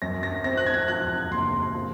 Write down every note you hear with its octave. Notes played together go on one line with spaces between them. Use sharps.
F#2 A#6
A#6
C4 A#6
F#6
G#6
F3 F#6
F#1 C6
F3